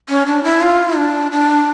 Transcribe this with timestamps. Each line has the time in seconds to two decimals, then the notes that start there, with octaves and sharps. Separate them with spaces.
0.09 C#4
0.26 D4
0.44 E4
0.61 F4
0.96 D4
1.32 D4